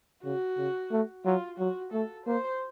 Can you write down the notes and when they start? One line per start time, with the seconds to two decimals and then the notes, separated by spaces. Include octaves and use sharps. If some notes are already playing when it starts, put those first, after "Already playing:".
0.24 C#3 F#4
0.57 C#3
0.91 A3
1.24 F#3 F4
1.58 F#3 F#4
1.92 A3 A4
2.26 A#3 C5